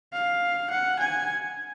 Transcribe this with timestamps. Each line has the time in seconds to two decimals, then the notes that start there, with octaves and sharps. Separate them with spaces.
0.13 F5
0.71 F#5
1.00 G#5